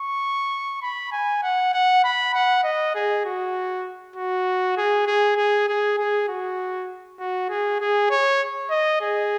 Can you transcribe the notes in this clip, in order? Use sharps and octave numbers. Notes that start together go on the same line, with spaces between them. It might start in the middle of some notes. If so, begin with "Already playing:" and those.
Already playing: C#6
B5
G#5
F#5
F#5
B5
F#5
D#5
G#4
F#4
F#4
G#4
G#4
G#4
G#4
G#4
F#4
F#4
G#4
G#4
C#5
D#5
G#4